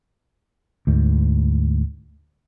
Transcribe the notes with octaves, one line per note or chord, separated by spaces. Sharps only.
D2 G#2